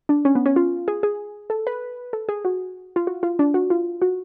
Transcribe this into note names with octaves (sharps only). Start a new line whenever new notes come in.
D4
C#4
B3
C#4
F4
G#4
G#4
A4
B4
A4
G#4
F#4
F4
F#4
F4
D4
F#4
F4
F#4